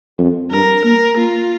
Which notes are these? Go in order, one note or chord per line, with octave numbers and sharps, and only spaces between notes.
F2
G2 A#4
A#3 A#4
A#3 F4